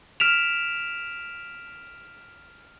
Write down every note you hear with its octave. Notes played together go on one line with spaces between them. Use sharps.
F6 B6 D7 E7 F7